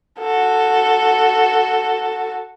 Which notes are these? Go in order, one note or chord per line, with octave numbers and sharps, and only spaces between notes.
F#4 A4